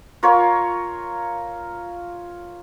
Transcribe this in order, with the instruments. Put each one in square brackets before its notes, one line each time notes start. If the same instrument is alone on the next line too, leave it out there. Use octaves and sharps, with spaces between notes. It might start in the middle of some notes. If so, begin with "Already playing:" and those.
[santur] F4 A#4 C#5